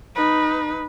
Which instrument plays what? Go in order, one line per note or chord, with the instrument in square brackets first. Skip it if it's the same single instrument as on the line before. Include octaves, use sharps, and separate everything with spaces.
[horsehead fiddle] D#4 B4